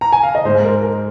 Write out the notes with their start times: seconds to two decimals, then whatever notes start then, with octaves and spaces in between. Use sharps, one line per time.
0.01 A#5
0.13 G#5
0.23 F5
0.35 D#5
0.45 G#2 C5
0.49 G#3
0.64 A#4
0.82 A#4